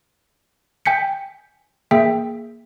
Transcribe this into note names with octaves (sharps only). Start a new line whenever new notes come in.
G5 G#5 G6 B6 C#7
A#3 G#4 E5 G5 B6